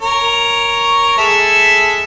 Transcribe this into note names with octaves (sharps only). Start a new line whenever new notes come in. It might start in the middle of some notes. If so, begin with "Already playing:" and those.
A#4 C#5
G#3 A4 E5